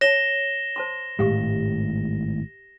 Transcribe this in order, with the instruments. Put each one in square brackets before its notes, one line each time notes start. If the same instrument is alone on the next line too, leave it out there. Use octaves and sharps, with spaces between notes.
[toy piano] C#5 A5 [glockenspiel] A#6 E7 G7
[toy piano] C5 A5 C6
[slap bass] G#1 A2 G#3 [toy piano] G4 F5 C#6